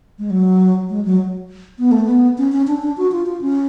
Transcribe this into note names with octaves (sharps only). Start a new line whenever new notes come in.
G#3
F#3
G#3
F#3
B3
A3
B3
C#4
C#4
D4
D4
F#4
F4
F4
C#4